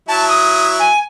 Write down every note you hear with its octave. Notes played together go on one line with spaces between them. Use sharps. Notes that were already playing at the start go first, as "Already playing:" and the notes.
F#3 E4 A5
D#6
G#5